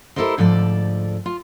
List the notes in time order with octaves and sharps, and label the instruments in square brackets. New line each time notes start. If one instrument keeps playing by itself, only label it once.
[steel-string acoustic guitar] E4 G4 A4 A#4 C5 D#5
D2 G#2 F3 A4 D5
F4